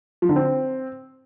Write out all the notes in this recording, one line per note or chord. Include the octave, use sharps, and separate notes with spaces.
F3
D3
C4